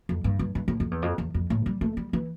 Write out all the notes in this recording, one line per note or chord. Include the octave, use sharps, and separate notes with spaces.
F2
G2
G2
G2
A2
F2
E2
F2
E2
F2
A2
G3
A3
G3
E3